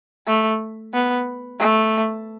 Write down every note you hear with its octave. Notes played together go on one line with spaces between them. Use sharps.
A3
B3
A3